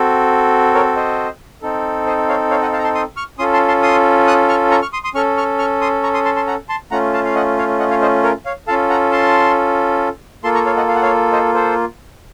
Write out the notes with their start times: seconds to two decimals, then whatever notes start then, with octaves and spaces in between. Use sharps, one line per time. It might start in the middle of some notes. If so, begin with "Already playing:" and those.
Already playing: C4 F#4 A4
0.75 A#4 C#5
0.96 C5 D#5
1.62 C4 D#4 A4
2.07 C5 D#5
2.29 C#5 F5
2.50 C#5 F5
2.62 D#5 F#5
2.73 F5 A5
2.78 A#5
2.84 A5 C6
2.95 C6 D#6
3.17 C#6 F6
3.39 C#4 F4 A4 C6 D#6
3.53 A5 C6
3.68 A5 C6
3.83 C6 D#6
4.27 D#6 F#6
4.49 C#6 F6
4.71 A#5 C#6
4.82 C#6 F6
4.93 C6 D#6
5.04 C6 D#6
5.15 C#4 A4 C#6 F6
5.37 C#6 F6
5.59 C#6 F6
5.81 C6 D#6
6.03 A#5 C#6
6.14 C6 D#6
6.25 A5 C6
6.36 A5 C6
6.47 F#5 A#5
6.69 A5 C6
6.91 A3 C#4 F4 F#5 A#5
7.13 F5 A5
7.25 F5
7.35 D#5 F#5
7.58 C#5 F5
7.79 D#5 F#5
7.90 C#5 F5
8.02 C5 D#5
8.23 A#4 C#5
8.46 C#5 F5
8.67 C#4 F4 A4 F5 A5
8.89 F#5 A#5
9.12 A5 C6
10.44 A#3 F4 A4 A5 C6
10.54 A#5 C#6
10.66 C#5 F5
10.77 D#5 F#5
10.88 F5
10.95 F#5
11.02 C#5 F5
11.32 C5 D#5
11.54 A4 C5